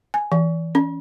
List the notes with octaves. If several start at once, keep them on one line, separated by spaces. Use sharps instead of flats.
G#5
E3
C#4